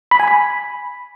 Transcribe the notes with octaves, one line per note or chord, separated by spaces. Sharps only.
B5
G#5
B5